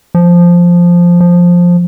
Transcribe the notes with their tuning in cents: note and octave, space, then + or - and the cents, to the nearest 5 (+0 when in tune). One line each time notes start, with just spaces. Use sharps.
F3 +0
F3 +10